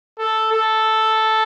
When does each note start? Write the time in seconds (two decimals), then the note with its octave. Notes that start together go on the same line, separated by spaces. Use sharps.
0.19 A4
0.53 A4